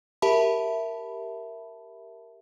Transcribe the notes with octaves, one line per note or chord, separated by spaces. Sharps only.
G4 A#4 E5 A5 B5